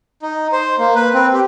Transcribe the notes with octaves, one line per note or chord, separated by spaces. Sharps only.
D#4
C5
A#3
B4
C4
G4